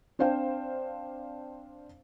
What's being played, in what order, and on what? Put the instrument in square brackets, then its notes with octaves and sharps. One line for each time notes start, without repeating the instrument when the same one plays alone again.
[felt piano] C4 D4 C5 F5 G5